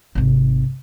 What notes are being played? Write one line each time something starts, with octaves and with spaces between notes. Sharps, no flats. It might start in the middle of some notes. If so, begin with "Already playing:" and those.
G#1 C3